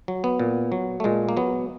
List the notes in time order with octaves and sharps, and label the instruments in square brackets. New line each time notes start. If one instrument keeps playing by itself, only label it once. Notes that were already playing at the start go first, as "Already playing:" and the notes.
[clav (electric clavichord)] F#3
B3
A#2
F#3
A3
A#2 G#3
A#3
F#3 B3